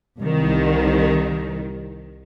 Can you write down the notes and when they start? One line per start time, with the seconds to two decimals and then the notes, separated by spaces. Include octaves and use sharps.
0.19 C2 D#3